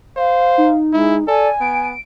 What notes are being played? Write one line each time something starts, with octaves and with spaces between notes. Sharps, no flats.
C5 F5
D#4
G#3 E4
A4 D5 G#5
B3 D7